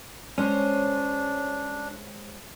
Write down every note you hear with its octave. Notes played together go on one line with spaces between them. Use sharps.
G#3 C#4 D4 C5 C#5